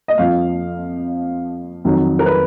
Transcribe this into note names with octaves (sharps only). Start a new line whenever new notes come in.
D#5
F2 F3 F5
F2 D#3 F#3
A#4
B4